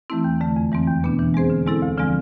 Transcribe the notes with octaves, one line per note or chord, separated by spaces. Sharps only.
E3 A3 C4 E4
E2
D3 A3
F2
E3 G#3 C4
E2
B2 B3 D4
E3
G#3 C4 G#4 C5
D3
G#3 C4 E4 A4
D2
D3 F3 G#3 C4